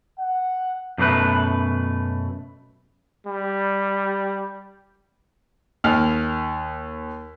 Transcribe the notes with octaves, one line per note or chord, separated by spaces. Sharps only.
F#5
F#2 B2 A3 B4
G3
D#2 F6